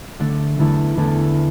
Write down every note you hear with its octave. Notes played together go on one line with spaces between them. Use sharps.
D3 A3 D4 A4
E2 D3 A3 E4 A4
E2 D3 A3 E4 A4